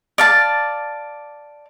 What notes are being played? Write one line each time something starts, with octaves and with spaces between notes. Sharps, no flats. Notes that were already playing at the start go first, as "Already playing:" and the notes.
D5 F5 A5